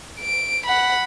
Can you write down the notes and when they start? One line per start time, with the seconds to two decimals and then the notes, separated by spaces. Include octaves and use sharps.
0.20 D7
0.66 F#5 B5